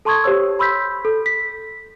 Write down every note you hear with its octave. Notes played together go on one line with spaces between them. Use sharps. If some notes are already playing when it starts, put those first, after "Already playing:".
A4 A5 C6 C#6 D#6 G#6
G4 C5 C#5 E6
B5 C6 E6 G6 B6
A4
B6